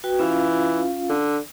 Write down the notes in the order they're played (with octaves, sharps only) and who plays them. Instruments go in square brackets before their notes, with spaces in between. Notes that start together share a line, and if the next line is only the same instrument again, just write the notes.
[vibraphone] F#4 B4 G5
[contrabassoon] E3 [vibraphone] C#4 F4 F5
[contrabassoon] D3